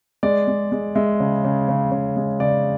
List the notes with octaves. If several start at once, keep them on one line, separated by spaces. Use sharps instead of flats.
G#3 D5
G#3
G#3
G#3 E5
C#3
C#3
C#3
C#3
G#3
C#3 D5